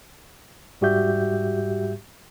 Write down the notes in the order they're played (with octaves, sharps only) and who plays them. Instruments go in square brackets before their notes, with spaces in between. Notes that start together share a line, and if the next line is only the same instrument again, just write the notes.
[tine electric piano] G#2 G3 F#4 G4 E5 G6